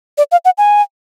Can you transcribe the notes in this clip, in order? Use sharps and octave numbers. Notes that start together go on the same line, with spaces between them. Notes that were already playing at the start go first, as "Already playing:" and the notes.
D5
F5
F#5
G#5